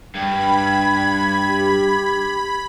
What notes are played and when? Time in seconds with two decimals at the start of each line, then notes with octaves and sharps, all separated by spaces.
0.15 G2 G5 B5 G#6
1.47 G4